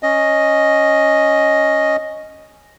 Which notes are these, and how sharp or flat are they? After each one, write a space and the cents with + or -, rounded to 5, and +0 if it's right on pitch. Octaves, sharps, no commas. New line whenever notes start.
C#4 +0 D#5 +0